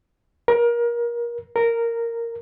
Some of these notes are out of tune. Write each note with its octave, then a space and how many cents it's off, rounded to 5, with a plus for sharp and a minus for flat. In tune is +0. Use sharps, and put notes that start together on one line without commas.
A#4 +25
A#4 -10